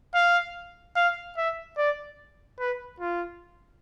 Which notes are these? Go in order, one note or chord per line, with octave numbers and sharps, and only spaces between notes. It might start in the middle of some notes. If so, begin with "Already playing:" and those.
F5
F5
E5
D5
B4
F4